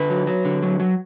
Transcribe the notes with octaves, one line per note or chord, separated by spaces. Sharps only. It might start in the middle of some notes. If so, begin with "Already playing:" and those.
Already playing: D3 B4
F#3
F#3
D3
F#3
F#3